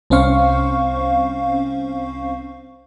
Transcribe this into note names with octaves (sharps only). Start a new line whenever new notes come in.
C2 C4 C#4 C5 F5 C#6